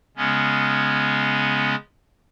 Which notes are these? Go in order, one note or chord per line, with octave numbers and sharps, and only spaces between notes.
C#3 G#3 B3 C#4